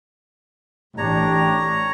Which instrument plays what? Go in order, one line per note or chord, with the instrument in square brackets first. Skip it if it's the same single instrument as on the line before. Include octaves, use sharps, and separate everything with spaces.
[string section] A1 [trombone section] D4 G4 [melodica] C#5 A#5